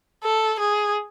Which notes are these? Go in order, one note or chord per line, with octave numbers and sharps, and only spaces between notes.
A4
G#4